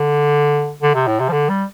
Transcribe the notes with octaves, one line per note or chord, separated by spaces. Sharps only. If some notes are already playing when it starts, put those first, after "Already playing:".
Already playing: D3
D3
C3
A2
C3
F3
D3
G3